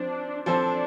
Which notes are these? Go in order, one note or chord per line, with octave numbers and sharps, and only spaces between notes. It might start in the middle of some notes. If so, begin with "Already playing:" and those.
Already playing: F3 C4 D4 C5
F3 C4 D4 A4 C5